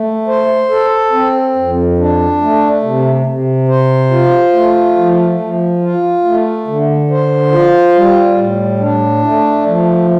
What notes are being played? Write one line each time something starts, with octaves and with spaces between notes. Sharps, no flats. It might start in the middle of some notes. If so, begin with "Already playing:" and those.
Already playing: A3
C5
A4
C4
F2
D4
A3
C3
C3
C5
F4
A3
F3
F3
F4
A3
D3
C5
F4
G3
A2
D4
A3
F3